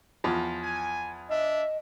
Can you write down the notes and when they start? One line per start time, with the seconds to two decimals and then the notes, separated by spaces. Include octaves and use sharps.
0.24 E2 F3
0.63 G#5
1.30 D4 D#5 E5